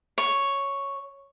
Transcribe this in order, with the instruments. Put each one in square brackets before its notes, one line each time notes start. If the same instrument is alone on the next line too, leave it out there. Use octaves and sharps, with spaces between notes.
[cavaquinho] C#5